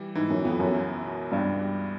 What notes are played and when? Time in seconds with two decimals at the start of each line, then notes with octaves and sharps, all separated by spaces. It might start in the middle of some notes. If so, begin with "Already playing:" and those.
Already playing: E3 G3
0.15 G#2 E3
0.30 F#2
0.44 F2 B3
0.60 F#2
0.74 C#2
1.03 B2
1.32 C#2 G2
1.61 G3